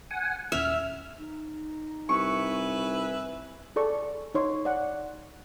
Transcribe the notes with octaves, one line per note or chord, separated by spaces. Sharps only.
F#5 G#5
D#1 C#4 E5 F6
D#4
C2 B4 E5 G#5 C#6
G#4 A4 D5 C#6
C#6
D#4 C#5 C6
D5 F#5